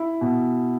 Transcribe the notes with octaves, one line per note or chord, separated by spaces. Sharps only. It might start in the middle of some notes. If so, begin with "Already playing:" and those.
Already playing: E4
B2